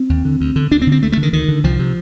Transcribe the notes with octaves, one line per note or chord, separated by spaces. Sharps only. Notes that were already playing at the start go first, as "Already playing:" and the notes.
Already playing: C4
D#2
D3
D2
D3
D2 D4
C4
D3
C4
D2 A3
A3
D3
D#3
D2 D#3
D3
C2 F3
C3